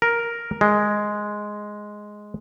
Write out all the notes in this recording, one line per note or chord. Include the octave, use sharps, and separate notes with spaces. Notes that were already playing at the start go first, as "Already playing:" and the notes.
A#4
G#3